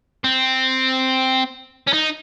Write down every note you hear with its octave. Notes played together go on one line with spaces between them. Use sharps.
C4
C#4
D#4